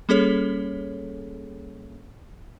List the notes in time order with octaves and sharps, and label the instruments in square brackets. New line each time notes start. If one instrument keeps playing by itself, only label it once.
[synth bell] G3 A#3 C#4 G#4 A4 C#5